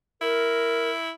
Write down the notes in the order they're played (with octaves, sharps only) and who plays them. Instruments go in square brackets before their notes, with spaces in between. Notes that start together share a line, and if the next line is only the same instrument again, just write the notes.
[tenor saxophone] E4 [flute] A#4